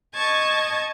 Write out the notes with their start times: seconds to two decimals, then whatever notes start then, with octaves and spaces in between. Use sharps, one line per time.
0.14 D#5 A5 C#6 G#6